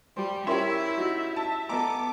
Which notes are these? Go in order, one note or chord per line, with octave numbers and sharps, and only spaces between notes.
G3 G4 C5
C#4 E4 G4 A#4 C5 C#5 E5
D#4 F#4
A5
B3 A4 D#5 A#5 D6